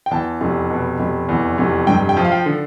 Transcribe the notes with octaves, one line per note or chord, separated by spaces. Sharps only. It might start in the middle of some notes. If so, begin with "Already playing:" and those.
G5
E2 A5
F1
B2
F1
E2
F1
G2 G5
G5
F3
F5
G5
D3